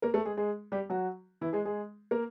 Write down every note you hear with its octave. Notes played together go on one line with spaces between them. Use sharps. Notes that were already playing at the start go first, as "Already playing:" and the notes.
A#3 A#4
A3 A4
G#3 G#4
G#3 G#4
G3 G4
F#3 F#4
E3 E4
G#3 G#4
G#3 G#4
A#3 A#4